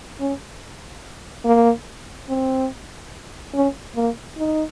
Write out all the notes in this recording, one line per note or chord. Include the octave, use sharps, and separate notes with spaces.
C#4
A#3
C4
C#4
A#3
D#4